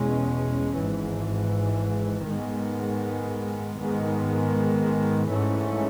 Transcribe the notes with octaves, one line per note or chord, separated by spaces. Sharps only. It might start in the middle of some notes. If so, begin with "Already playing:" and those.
Already playing: E2 B2 G#3 C#4
G#1 G#2 E3
G#2 D#3 G#3 B3
G#2 D#3 G#3 B3
G#2 E3 A3 C#4